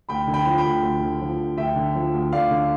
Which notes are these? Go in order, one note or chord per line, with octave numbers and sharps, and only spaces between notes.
D2 G5 B5
D3
G5 B5
F3
G5 B5
D2
D2
D3
F3
D2
D2 E5 G5
D3
F3
D2
D2 D5 F5
D3